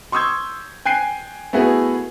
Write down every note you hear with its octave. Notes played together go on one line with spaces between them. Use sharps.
C6 C#6 D#6 E6 G6 G#6
G5 G#5 F#6 C7 D#7
A3 B3 E4 F#4 G#4